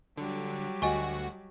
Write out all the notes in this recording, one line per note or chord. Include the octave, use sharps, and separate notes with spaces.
D3 F#3 G3
D2 F#4 D#5 G#5 C#6